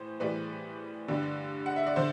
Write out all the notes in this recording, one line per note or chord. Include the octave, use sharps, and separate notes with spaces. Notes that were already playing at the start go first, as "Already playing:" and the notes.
Already playing: A2 E3 C5
A2 E3 G3 B4 D5
G2 D3 G3
F#5
E5
D5
D3 C5